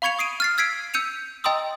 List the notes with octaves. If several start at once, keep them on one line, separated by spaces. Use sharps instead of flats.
F5 B5 C#6 G#6 C#7 F7
D#6 C7 D7 D#7
F6 A6 C7
E6 G#6 B6 C7 D7
E6 G6 C#7 D#7 F7
D#5 G5 A#5 C6 D#6 E6